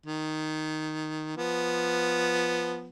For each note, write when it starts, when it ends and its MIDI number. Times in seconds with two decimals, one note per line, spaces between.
0.06 1.32 51
1.37 2.90 53
1.37 2.90 59